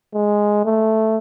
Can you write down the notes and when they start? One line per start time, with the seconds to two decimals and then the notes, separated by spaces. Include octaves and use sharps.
0.14 G#3
0.65 A3